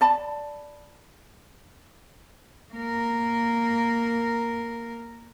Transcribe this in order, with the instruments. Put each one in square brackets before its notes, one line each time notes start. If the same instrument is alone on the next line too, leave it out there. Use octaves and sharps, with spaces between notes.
[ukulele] D5 A5 B5
[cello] A#3 A#4